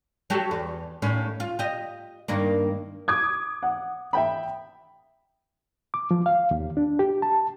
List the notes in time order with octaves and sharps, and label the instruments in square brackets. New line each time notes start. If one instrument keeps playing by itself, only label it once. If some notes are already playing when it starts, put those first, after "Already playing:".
[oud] F#3 G4 A4
E2
D#2 A2 C#4
F4
G4 D#5
G2 D#3 A#3
[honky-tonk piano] D6 D#6 G#6
[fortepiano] F#5
E5 G5 B5
[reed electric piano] D6
F3
F5
D#2
D4
G4
A5